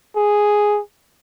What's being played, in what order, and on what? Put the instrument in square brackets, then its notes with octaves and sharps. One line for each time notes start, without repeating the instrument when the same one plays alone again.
[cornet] G#4